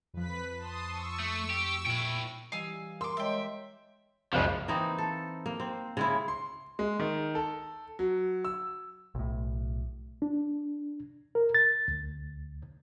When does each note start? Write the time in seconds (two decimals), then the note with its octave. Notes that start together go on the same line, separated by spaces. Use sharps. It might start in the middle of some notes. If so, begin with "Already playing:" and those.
0.14 F2 F3 B4 B6
0.56 A5 C6 D#6
0.87 C#6 E6
1.19 A3
1.50 G4
1.87 A#2 E4 G5
2.52 E3 G3 D#5 F5 G#5 E6
3.01 A#4 C6 D6 E6
3.17 G#3 C#5 D#5 E5 G5
4.33 C#2 F#2 C#3 F3 F#4 C5 D5
4.68 E3 A#3 C4 D#4
4.98 A4
5.46 A#3
5.60 C4
5.97 C#3 G#3 E4
6.28 C6
6.79 G#3
7.00 D#3
7.35 A4
7.99 F#3
8.45 E6
9.15 B1 A2
10.22 D4
11.35 A#4
11.55 A6
11.88 D2